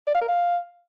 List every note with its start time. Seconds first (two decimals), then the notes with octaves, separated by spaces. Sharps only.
0.07 D5
0.14 F5
0.21 A#4
0.28 F5